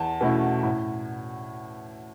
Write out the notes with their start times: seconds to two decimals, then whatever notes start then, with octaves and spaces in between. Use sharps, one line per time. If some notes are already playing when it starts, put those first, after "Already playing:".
Already playing: E2 A5
0.21 B2 A3 C#4 E4
0.63 A2